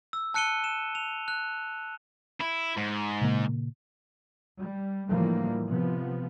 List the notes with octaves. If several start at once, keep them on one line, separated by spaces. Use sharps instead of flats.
E6
A5 F#6 C#7 D#7 G7
E7
F7
F#6
E4
G#2
A#2 C#3 A#3
G3
A2 D3 E3 F3 G3 A#3
C3 F3 B3